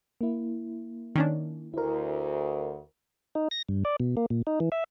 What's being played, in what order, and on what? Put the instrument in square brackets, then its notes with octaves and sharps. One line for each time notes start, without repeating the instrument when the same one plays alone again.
[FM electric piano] A#3 E4
[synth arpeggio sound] D#3 C#4 D4
[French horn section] D2 [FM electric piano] E4 A#4
[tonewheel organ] D#4
A#6
G2
D5
B2
A#3
A#2
D#4
E3
E5